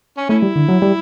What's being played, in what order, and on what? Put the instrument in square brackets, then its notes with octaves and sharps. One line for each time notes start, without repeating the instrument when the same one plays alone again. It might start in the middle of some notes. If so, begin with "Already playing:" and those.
[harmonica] C#4
[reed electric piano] A3 [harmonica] C#4 E4
[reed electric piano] G3
D3
F#3
G3